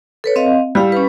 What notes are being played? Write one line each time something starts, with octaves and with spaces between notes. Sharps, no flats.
A4 B4 C#5
C4 D#5 F5
G3 E4 F5
C#4 B4